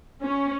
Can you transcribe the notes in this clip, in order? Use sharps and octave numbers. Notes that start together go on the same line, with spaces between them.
C#4